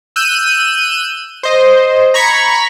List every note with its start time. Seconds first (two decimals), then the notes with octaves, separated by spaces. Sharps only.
0.16 E6 F#6 G6 D#7
1.43 C5 D#5
2.14 A#5 B5 C#6 G#6 B6